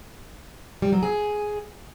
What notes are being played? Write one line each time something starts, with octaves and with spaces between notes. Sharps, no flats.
G3
F#3
G#4